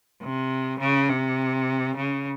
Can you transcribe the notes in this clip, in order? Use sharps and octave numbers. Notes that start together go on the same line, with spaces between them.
C3
C#3
C3
C#3